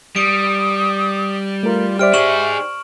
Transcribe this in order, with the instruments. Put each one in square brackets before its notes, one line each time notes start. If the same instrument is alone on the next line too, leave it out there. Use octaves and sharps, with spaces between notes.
[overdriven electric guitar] G3 [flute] D#6 [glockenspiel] D7
[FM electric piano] A3 A#4 [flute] F4
[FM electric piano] G4 C5 D5 [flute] E5 [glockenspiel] F6 D7
[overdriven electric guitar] D#4 G#4 [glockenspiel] C#6 E7 F#7